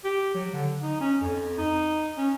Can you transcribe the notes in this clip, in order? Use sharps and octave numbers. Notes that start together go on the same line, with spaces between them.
G4
F#3
D3
D#4
C#4
F2
D#4
C#4